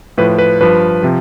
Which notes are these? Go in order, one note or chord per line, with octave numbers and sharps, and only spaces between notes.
A2 F3 B4
B4
G2 F3 B4
C3 F3